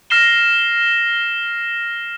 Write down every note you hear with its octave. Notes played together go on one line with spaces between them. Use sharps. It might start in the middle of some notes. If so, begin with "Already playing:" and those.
F6 A#6 C7 E7 G7